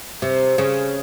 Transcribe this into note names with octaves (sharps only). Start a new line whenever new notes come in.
C3
C#3